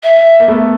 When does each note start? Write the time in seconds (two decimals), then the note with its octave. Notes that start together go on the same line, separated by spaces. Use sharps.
0.03 E5
0.40 A#3
0.48 A3 B3